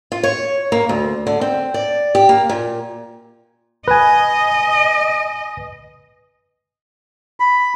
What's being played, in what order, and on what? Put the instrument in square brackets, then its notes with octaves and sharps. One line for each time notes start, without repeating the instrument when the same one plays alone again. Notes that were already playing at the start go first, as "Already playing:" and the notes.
[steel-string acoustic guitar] F4
C#5
A#3
D2
D3
C4
D5
G4
A#3
A#2
[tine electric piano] B4 G#5 [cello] D#5
[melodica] B5